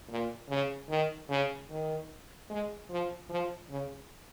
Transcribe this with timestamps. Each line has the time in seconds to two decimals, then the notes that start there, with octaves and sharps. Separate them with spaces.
0.10 A#2
0.49 C#3
0.89 D#3
1.29 C#3
1.70 D#3
2.50 G#3
2.89 F3
3.30 F3
3.70 C#3